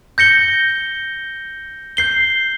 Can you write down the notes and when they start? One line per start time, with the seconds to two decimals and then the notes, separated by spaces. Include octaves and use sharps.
0.18 G6 A#6 C#7 G7
1.97 G6 C7 G7